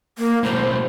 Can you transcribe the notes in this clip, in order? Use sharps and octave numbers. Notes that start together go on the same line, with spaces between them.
A#3
B1 A2 C5